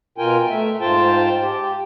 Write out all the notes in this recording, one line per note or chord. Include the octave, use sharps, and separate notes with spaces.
B2 F4 A#4 G5 G#5
A3 E5
G#2 F4 C5 G5 A5
G4